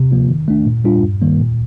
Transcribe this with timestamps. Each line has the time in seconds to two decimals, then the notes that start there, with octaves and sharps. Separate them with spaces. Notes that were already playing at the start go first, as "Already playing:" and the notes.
Already playing: C3
0.11 F3 A#3 F4
0.29 D#3
0.48 A3 D4
0.66 A#2
0.84 G3 D4 F4
1.03 G2
1.21 D#3 G3 A#3
1.40 A#2